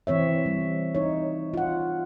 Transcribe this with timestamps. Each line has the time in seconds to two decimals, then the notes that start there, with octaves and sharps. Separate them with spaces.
0.07 E3 C4 C#5 E5
0.46 G3
0.95 D#4 C#5
1.54 F4 F#5